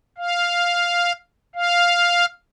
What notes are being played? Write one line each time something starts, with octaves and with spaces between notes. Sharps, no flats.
F5
F5